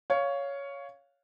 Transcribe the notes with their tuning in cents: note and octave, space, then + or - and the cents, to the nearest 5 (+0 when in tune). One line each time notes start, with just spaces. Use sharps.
C#5 +10 F5 +0